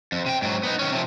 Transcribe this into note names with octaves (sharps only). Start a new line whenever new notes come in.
F2
C3 G5
G#2 F#3
B3 D#4
D#3 C#4
C3 F3